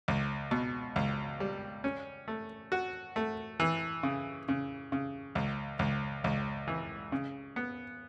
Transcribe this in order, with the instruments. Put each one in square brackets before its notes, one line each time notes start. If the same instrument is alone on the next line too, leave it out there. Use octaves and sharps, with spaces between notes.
[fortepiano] C#2
B2
C#2
G3
C#4
A3
F#4
A3
E3
C#3
C#3
C#3
C#2
C#2
C#2
E3
C#3
B3